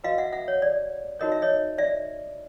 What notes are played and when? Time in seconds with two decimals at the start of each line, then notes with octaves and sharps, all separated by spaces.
0.04 F#4 B4 D#5 F5
0.18 E5 F#5
0.33 E5 F#5
0.48 C#5
0.62 D5
1.19 D#4 F#4 A#4 C#5 D#5
1.32 E5
1.42 C#5 D#5
1.78 D5 E5